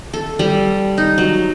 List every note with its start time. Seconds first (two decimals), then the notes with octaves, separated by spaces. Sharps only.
0.13 A4
0.39 G3
0.98 D#4
1.18 F#3